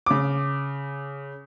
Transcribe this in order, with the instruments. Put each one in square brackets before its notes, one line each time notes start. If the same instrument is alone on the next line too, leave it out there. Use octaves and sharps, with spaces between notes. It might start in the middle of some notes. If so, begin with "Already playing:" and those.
[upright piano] C#3 D6